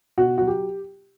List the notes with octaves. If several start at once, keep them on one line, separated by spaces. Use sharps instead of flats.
B2 F#4
F#3 F#4
G4